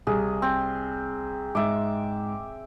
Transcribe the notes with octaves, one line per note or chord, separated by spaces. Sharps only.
C2 G#4
C4
G#2 E5 D6